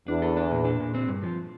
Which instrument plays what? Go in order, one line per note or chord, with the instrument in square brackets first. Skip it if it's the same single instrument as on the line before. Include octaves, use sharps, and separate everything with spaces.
[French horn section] E2 [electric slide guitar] D4
[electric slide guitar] A4
D4
A#2
D4
A#2
C4
G2
F3